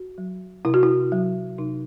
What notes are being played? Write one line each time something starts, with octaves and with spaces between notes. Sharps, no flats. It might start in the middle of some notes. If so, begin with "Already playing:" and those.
Already playing: F#4
F#3
C3 E4
F#4
E4
F#3
C3 D#4